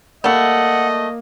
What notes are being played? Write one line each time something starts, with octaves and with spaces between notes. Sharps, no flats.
G3 A3 A#3 D#5 F#5